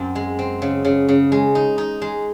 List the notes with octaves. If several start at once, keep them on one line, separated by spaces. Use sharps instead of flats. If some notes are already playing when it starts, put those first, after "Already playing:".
Already playing: F#2 C4
G#3
C4
C#3
C#3
C#3
G#3
D#4
D#4
G#3